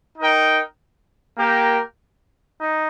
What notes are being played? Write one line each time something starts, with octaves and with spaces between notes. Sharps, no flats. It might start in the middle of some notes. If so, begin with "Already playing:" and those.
D#4 A#4 G5
A#3 G4 A#4 G5
D#4